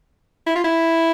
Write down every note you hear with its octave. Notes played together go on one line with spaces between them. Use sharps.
E4
F4
E4